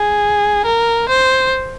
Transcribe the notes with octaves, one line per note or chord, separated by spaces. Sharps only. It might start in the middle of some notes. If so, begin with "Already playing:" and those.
Already playing: G#4
A#4
C5